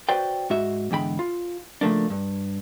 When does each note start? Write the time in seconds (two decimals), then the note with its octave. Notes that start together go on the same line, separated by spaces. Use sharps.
0.09 F#4 B4 C5 D5 G5
0.50 G#2 F#4 E5
0.91 E2 G#2 D3 G5 B5
1.19 F4
1.81 C#3 F3 A3 A#3 D4
2.10 G2